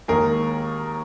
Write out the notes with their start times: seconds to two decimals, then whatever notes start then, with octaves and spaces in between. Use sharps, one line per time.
0.08 D#2 D#3 G#3 G#4 A#4